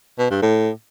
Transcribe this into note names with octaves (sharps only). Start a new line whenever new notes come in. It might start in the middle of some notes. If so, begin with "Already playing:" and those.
B2
G2
A2